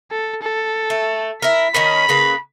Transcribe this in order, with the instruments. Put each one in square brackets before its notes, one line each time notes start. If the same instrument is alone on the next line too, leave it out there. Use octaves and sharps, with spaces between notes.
[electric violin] A4
A4
[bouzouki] A3
[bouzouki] E4 A#4 [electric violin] B6
[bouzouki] D#3 C#4 A#4 [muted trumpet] B5
[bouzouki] C#3 A#3 B4